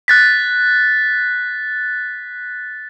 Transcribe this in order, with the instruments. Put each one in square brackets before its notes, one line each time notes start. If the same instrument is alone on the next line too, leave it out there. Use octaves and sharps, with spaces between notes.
[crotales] F#6 A6 B6